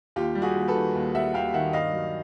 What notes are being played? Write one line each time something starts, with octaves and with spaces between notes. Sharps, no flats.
D#2 F4 G4
G3
F#4 G#4
D#2
A4 B4
D#3
D#2
G3 E5 F#5
D#2 F5 G5
D#3 E5 F#5
G2 D#5 F5
F#3